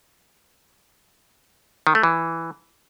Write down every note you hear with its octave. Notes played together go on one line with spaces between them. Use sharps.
D#3
A3
E3